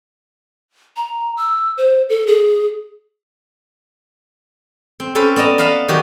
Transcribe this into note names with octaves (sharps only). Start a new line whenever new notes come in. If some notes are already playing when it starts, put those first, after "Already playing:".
A#5
E6
C5
A4
G#4
C4
C4 C#4 A4 B4 C5
B3 D5 D#5 A5 A#5
B4 D#5 F5 F#5 A5
D#3 F#3 F#4 G4